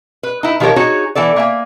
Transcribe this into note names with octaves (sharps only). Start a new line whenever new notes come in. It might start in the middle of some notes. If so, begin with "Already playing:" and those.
B4
D#4 E4
D#3 F3 G4 A4 A#4 C#5
D#4 F#4 G#4 C#5
E3 B3 A4 D5
A#3 E5 G#5